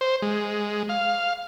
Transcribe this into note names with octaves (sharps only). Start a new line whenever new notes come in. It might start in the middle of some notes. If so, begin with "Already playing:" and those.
C5
G#3
F5